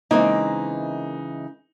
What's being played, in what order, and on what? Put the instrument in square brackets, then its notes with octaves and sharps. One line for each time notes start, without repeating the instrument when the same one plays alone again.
[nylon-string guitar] C#3 E3 G#3 [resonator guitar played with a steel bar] A#3 C4 [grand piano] D#4